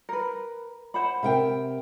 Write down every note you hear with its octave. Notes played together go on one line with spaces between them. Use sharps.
A#4 B4
C5 F#5 B5
C3 A#4 G5